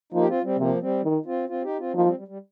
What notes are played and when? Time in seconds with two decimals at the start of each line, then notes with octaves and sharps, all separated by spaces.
0.12 F3 A#3 D#4
0.21 G4
0.28 C4 F4
0.43 G3 C4
0.58 C3 F3 A#3
0.81 G3 C4
1.04 D#3
1.26 C4 F4
1.48 C4 F4
1.64 D#4 G4
1.78 C4 F4
1.94 F3 A#3 D#4
2.05 G3 C4
2.17 G3
2.28 G3